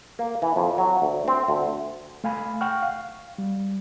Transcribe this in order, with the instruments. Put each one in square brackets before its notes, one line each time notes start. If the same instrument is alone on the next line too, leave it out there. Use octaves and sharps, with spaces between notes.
[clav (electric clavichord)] A#3
E3
F2
F#3
D2
C4
D2
[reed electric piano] A3 F5 G#5 B5
F#5 G5 C#6 F6
F5
G3